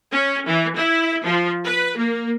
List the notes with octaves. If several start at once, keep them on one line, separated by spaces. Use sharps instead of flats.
C#4
E3
E4
F3
B4
A#3